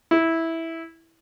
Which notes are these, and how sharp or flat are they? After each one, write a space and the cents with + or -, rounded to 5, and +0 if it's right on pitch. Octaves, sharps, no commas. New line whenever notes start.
E4 -10